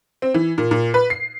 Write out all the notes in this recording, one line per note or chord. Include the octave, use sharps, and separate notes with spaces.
C4
E3
A#2
A#2
B4
C7